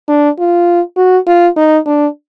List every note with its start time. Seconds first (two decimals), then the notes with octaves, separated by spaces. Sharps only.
0.09 D4
0.39 F4
0.97 F#4
1.26 F4
1.57 D#4
1.86 D4